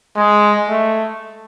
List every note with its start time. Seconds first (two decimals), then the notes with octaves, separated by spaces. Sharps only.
0.16 G#3
0.68 A3